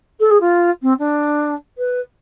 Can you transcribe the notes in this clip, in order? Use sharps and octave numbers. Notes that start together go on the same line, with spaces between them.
A4
G#4
F4
C4
D4
B4